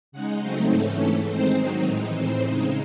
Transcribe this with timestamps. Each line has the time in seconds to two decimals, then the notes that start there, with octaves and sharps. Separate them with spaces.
0.12 C#3 G#3 D#4 F#5
0.40 C#3 F#3 A3 C4 D#4 C5
0.70 G#2 E3 A3 C#4 A4
0.99 G#2 E3 A3 A4
1.28 D#3 G#3 C4 D#4 C5
1.57 D#3 F#3 C4 D#4
1.85 A2 E3 G#3 D#4
2.15 A2 E3 C4 C5
2.44 C#3 G#3 D#4